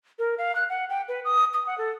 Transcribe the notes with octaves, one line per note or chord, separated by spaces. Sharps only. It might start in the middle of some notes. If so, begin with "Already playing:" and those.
A#4
F5
F#6
F#5
G5
B4
D#6
D#6
F#5
A4